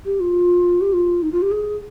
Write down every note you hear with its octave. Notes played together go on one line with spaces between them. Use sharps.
G4
F4
G4
F4
D#4
F4
G4
G#4